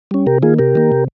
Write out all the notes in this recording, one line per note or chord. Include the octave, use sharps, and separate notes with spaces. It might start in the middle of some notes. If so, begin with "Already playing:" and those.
G3 C#4
C3 G4 A#4
D#3 A#3 F4 G#4
C3 G4 A#4
D#3 A#3
C3